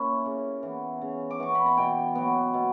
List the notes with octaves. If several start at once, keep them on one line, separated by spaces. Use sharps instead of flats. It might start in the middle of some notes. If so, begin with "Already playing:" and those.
Already playing: A#3 C#4 E4
C#3
E3 B3
C#3
D6
E3 B3 C#6
B5
A#5
B2 G5
F#3 B3
B2